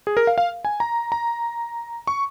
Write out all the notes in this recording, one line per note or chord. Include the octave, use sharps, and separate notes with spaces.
G#4
A#4
F5
F5
G#5
A#5
A#5
C#6